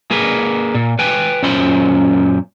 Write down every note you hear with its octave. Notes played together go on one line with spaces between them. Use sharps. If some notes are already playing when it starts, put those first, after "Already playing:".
A#3 G#4 B4
A#2
B4 G5 G#5
F#2 A#2 C#4 C5 B5 C6